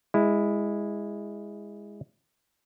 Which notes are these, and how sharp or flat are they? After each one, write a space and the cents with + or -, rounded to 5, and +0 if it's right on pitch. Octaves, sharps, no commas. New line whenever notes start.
G#3 -15 E4 +5